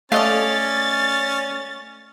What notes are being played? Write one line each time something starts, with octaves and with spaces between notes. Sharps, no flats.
A3 C#4 D5 D#5 F5 A6